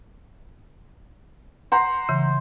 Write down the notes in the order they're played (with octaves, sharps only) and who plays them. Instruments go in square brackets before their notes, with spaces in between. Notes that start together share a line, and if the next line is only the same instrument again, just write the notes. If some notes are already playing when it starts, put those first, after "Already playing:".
[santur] C5 [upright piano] F#5 A#5
[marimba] C#3 E3